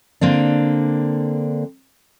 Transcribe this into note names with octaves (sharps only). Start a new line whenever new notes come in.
D3 A#3 C4 D4